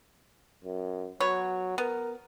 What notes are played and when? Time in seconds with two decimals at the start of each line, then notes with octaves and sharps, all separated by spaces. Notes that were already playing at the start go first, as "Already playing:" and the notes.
0.64 F#2
1.20 F#3 B3 C#5
1.78 B3 A#4